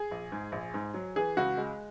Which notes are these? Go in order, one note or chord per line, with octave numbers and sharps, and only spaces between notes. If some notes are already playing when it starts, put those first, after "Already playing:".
Already playing: G#4
A#1
G#2
A#1
G#2
F#3
E3 G#4
C#2 F#4
G#3